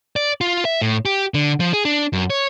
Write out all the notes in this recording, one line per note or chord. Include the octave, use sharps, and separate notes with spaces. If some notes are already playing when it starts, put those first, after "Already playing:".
D5
F4
E5
A2
G4
D3
F3
G#4
D4
F#2
C#5